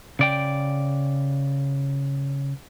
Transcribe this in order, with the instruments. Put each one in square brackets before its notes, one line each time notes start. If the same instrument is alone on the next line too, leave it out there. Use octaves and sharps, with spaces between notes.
[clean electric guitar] C#3 D5 G5